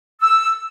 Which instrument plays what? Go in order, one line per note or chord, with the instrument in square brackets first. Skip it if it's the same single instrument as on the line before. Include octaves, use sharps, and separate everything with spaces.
[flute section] E6